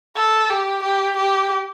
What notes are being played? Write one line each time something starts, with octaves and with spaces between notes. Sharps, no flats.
A4
G4
G4
G4